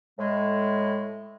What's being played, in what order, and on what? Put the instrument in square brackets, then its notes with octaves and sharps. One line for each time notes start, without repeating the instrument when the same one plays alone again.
[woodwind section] A2 G#3